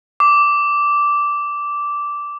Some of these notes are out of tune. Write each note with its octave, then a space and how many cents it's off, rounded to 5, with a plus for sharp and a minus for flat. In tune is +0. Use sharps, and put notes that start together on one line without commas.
D6 -10